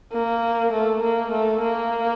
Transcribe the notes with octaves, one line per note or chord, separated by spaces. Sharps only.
A#3
A3
A#3
A3
A#3